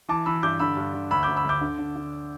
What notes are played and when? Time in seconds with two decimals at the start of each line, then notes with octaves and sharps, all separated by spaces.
0.09 E3 A5 D6
0.26 E3 B5 E6
0.43 G2 D6 G6
0.59 D3 B5 E6
0.77 G2
0.94 D3
1.11 D2 B5 E6
1.23 D2 D6 G6
1.36 B5 E6
1.44 D2
1.49 D6 G6
1.61 D3
1.78 D3
1.96 D3